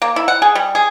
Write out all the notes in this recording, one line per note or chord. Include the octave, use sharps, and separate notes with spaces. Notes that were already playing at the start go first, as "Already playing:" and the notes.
A#3
E4
F#5
G#4
G3
G#4